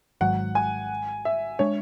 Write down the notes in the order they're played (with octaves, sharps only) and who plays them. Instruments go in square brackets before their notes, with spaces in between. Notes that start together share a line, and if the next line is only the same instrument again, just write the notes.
[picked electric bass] G#1 G#2 F#3 [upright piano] F#5
[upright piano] G#5
E5
[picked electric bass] G#3 D4 [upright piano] C#5